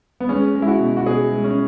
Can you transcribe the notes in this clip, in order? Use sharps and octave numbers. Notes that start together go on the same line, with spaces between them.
B3
G#3 C#4
G#3
E4
F#4
B2
F#4
B2 G#4
G#3
C#4